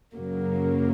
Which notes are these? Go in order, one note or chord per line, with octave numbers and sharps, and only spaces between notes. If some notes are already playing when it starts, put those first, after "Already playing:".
F#2 C#3 F#3 A#3